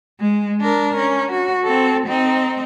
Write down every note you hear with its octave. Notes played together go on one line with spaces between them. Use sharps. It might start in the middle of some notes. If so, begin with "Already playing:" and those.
G#3
D4 A#4
C#4
F#4
C4 A4
C4 D#4